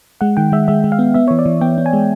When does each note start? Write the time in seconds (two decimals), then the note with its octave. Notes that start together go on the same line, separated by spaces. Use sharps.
0.21 G#3 F#5
0.37 D#3 G5
0.52 G#3 E5
0.68 G#3 E5
0.84 G#3
0.92 F5
0.99 B3
1.14 B3 E5
1.28 E3 C#5
1.39 D5
1.46 E3
1.61 B3 G5
1.78 B3
1.86 G#5
1.93 G#3